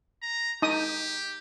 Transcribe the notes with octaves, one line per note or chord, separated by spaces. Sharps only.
A#5
D#4 G4 D#6